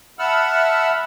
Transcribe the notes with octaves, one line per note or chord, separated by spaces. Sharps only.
E5 F#5 A5 B5 E6 F6